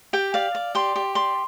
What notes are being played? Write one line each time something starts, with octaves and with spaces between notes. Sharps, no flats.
G4 G5
D5 F5
D5
G4 C6
G4
D5 C6